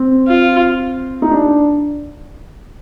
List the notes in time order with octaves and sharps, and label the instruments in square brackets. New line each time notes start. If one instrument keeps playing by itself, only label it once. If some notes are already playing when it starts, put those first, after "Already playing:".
Already playing: [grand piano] C4
[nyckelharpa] F4
[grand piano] D#4
D4